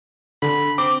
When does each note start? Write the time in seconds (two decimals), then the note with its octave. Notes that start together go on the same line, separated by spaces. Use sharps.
0.42 D3 B5
0.78 C4 D6